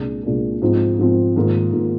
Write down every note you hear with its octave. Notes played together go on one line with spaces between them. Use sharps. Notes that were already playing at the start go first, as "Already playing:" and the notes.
Already playing: C2 A#2 G#3 D4 G#4
C2 A#2 G#3 D4 G#4
G#2 F3 C4
G#2 F3 C4
G#2 D#3 A#3 F4
G#2 D#3 A#3 F4